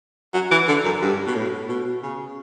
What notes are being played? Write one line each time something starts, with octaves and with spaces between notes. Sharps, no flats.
F#3
E3
D3
F#2
G2
B2
A2
B2
C#3